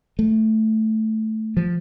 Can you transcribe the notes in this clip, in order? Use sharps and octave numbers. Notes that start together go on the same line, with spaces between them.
A3
F3